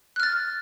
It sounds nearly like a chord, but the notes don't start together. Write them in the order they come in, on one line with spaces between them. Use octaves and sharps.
F#6 F6 A6